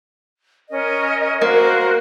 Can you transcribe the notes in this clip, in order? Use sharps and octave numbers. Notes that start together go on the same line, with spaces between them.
C#4 A#4 D#5
A#3 F#4 A#4 C5